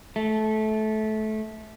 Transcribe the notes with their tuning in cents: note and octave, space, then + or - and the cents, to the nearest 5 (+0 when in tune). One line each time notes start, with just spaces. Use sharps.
A3 -20